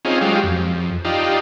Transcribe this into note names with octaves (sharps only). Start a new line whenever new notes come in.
C4 C#4 D#4 F4 G#4
F#3 G#3 F4 G4
F2
D4 D#4 F4 G4